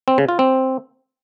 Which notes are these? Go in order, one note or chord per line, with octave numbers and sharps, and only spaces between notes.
C4
C#3
F4
C4